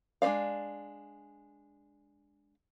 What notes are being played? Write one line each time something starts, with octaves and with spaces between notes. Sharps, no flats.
G#3 D4 C5 D5 F5